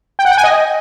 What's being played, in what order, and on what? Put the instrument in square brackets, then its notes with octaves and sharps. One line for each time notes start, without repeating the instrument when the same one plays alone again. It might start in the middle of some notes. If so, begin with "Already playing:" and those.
[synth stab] G5
F#5
G5
G#5
D#5